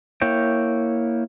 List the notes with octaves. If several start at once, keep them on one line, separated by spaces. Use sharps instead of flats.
A#3 E4 C#5 G5